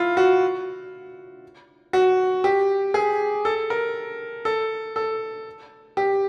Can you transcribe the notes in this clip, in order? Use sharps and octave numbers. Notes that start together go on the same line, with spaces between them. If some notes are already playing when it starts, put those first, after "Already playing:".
Already playing: E4 F4
F#4
F#4
G4
G#4
A4
A#4
A4
A4
G4